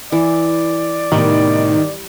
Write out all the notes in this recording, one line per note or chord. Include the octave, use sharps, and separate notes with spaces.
E3 D5
A2 C3 D#3 G3 B3